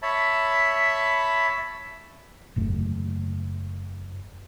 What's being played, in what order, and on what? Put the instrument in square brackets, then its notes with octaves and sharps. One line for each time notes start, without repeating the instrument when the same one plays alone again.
[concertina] C#5 E5 A5 B5
[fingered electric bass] F#1 E2 A3